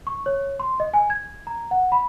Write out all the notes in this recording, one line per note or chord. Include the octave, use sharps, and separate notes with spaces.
C#6
C#5
C6
D#5
G#5
G#6
A#5
F#5
B5